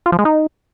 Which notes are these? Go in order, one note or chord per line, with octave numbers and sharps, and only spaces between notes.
F4
F3
G#3
D#4